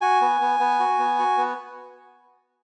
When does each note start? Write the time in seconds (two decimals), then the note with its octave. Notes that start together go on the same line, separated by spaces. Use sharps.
0.01 F#4 G#5
0.21 B3
0.41 B3
0.60 B3
0.80 F#4
0.99 B3
1.19 F#4
1.38 B3